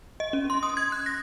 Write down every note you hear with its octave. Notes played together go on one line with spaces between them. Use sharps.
D#5
C#4
C6
D#6
G#6
F#6
A#6